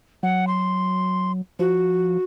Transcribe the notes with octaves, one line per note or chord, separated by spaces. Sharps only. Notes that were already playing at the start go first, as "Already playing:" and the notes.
F#3 F#5
C6
F3 F#4